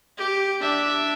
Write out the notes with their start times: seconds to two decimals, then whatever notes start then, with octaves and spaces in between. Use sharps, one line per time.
0.17 G4
0.62 D4 E5